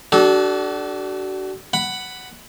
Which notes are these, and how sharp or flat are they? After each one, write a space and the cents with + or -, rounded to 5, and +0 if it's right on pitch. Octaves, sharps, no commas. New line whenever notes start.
D4 +0 F#4 +40 A4 -25
F#5 +10 B5 +0